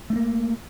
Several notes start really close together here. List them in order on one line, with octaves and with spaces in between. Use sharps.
A3 D4 A#3